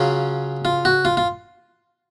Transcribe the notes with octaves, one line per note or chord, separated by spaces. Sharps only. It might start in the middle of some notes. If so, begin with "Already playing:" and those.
Already playing: C#3 F#3 C#4 F4
F4
F#4
F4
F4